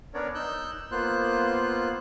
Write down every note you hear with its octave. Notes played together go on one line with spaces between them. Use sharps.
B3 C#4 D4 A#4 C#5 D5
D#4 E6 F#6 G6
A#3 B3 F4 C5 F#6